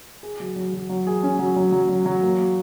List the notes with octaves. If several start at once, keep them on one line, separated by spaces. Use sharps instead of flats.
G#4
F#3
F#3
F#3
F#3
G#4
C#4
F#3
F#3
F#3
F#3
F#3
A#3